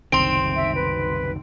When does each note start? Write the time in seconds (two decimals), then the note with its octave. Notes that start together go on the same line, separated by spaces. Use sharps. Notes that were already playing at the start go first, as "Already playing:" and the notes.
0.12 F#1 C2 D#3 C4 C6 D7
0.56 E5
0.75 B4